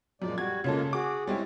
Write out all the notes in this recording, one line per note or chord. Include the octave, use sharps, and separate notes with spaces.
F#2 A#2 F3 G#3 D5
G3 F#4 G#6
C#3 G#3 A#3 C#4 F4 A4
F#4 G#4 D6
G3 G#3 C4 E4 C#5